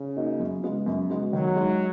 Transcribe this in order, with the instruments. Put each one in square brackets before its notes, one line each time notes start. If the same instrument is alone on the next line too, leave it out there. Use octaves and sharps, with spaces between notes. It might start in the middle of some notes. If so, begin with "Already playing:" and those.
Already playing: [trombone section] C#3
[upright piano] A#3 D#4 F#4
F#2
C#3 G#3 B3 F#4
F#2
C#3 G#3 B3 F#4
[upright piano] D#3 [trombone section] F#3
[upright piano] G#3 D#4